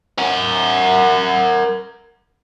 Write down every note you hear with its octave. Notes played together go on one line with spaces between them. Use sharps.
A#4 F#5